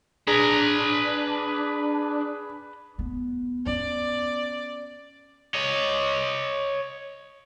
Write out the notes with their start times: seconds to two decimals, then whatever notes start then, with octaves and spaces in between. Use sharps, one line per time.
0.27 D4 G#4 B4 A#5
2.98 A3 B3
3.66 B3 C#4 D5
5.55 C#5 D#5